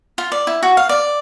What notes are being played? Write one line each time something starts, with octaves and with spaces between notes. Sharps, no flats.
F4
D5
E4
F#4
F5
D5